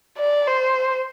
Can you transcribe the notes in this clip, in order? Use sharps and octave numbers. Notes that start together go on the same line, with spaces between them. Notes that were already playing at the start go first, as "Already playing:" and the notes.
D5
C5